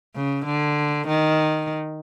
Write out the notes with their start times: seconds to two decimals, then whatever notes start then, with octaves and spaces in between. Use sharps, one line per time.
0.15 C#3
0.45 D3
1.07 D#3